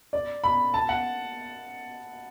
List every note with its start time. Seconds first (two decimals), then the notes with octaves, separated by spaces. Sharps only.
0.13 D5
0.44 B5
0.74 A5
0.89 F#5